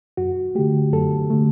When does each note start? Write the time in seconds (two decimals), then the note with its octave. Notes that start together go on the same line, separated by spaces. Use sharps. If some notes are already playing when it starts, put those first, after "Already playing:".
0.17 F#2 F#4
0.55 D3 A3 G4
0.92 F#2 A4
1.30 D3 A3